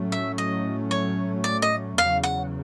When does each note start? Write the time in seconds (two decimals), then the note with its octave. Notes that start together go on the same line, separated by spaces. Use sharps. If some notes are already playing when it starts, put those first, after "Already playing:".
Already playing: A2 F#3 A3 C#4
0.12 E5
0.38 D#5
0.91 C#5
1.44 D5
1.62 D#5
1.97 E2 C#3 F#3 F5
2.23 F#5